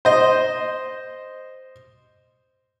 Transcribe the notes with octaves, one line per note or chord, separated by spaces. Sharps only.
C5 D#5